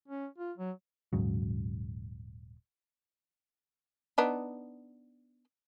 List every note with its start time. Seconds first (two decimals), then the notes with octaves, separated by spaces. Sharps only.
0.08 C#4
0.38 F4
0.58 F#3
1.13 D#1 G#2 C#3 F#3
4.18 B3 D4 D#4